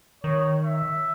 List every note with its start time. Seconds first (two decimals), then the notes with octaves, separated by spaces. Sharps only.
0.23 D#3 C#5
0.65 E5